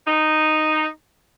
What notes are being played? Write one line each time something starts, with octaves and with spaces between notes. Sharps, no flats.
D#4